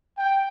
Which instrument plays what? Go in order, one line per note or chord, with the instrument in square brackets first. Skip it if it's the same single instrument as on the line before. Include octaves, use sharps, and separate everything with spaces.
[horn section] G5